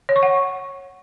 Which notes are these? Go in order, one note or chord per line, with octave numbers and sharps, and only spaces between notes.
C#5
C#6
F#5